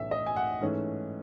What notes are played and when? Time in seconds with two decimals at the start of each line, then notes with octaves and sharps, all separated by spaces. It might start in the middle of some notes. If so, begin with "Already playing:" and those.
Already playing: B1 A2 E3 A3 C#4 E5
0.11 D#5
0.26 G#5
0.36 F#5
0.61 G#2 E3 A3 C#4